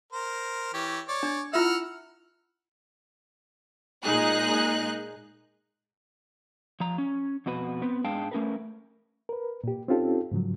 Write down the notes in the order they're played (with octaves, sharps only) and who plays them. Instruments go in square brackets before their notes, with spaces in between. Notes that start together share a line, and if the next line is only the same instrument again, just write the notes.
[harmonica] A#4 C5
E3 G4 C#5
C#5 D5
[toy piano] D4
[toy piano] E4 F4 E5 [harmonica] F#5 E6 F6
[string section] A#2 G#3 D#4 G#4 F#6
[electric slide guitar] F3 A#5
C#4
F2 B2 F#4 B4
B3 C4 B4
G#2 G#3 D4 F5 G5 A5
A3 C#4 A#4 B4
[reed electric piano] A#4 B4
A#2 G4
C4 C#4 D#4 F4 G4 A4
G#2 C#3 F3 F#3